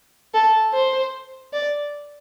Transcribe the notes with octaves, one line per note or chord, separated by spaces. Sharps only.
A4
C5
D5